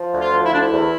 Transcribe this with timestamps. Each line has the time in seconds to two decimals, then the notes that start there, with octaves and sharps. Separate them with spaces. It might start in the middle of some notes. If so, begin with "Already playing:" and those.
Already playing: F3
0.13 D2
0.20 F4
0.32 F3
0.45 E4
0.52 D2 D4
0.60 E4
0.71 E2